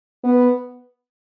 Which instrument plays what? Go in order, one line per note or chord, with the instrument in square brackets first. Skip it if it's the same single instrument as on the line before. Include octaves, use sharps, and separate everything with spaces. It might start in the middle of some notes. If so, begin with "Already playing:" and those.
[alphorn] B3